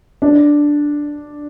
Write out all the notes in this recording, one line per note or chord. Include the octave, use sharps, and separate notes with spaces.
D4